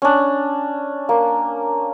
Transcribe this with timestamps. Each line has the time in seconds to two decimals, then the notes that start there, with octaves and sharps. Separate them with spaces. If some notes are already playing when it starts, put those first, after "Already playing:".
0.02 C#4 D4
1.09 A#3